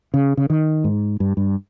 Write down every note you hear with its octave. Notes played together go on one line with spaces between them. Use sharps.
C#3
C#3
D#3
G#2
G2
G2